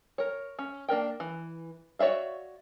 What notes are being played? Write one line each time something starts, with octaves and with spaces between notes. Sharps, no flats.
A#4 C#5
C#4
A#3 D4 A#4 G5
E3
F#4 C#5 D5 E5 F5